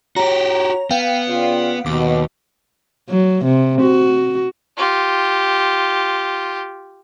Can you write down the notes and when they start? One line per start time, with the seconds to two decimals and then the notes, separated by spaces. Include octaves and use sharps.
0.16 F#4 G4 C#5 A#5
0.91 B3 F5 G5
1.27 C#3 F4 D5
1.86 D#2 B2 D6
3.09 F#3
3.45 C3
3.81 F#4
4.77 F4 G4